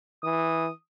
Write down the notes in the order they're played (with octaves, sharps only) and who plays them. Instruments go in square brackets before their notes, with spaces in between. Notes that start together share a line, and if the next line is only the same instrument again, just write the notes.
[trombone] E3 [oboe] D#6